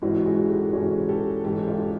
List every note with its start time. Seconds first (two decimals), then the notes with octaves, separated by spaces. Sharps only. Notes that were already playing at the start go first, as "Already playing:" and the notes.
0.02 G#2 E3 G#3 C#4 E4 F#4
0.26 F#4 G#4
0.50 G4 A4
0.67 A4
0.73 G#2 E3 G#3 C#4 F#4 G#4
1.09 G4 A4
1.44 G#2 E3 G#3 C#4 G4 A4
1.67 F4 G4